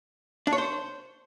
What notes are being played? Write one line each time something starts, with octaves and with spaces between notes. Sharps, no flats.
D4
C#5
C5